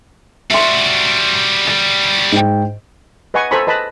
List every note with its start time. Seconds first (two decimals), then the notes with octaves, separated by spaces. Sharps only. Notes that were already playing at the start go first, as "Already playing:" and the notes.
0.50 G3 F#4 E5 C6
1.67 D7
2.32 G#2 G5
3.34 B4 D#5 F#5 G#5 C#6
3.51 A4 C5 G#5 A#5 B5 C#6
3.67 B4 D#5 A5 B5